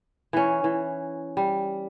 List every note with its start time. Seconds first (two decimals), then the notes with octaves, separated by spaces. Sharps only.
0.33 E3 C#4
0.64 E3
1.37 G3